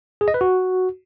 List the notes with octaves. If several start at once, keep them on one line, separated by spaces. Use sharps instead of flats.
G#4
D#5
B4
F#4